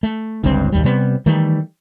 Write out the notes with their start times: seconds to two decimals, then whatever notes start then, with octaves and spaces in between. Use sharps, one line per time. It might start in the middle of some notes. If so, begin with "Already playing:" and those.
0.03 A3
0.44 G1 C#2 G2 C4
0.72 A1 D#2 G3
0.84 C3 G3 B3
1.26 D#3 E3 G3 A3